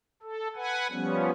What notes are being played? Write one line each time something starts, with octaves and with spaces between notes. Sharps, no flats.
A4
B4 F#5 G#5
F3 G3 B3 C#4